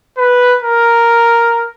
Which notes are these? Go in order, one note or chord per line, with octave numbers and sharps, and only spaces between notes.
B4
A#4